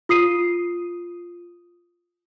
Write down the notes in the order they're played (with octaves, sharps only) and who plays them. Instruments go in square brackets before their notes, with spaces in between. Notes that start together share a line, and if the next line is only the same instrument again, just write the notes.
[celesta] F4 D#6 C7 D#7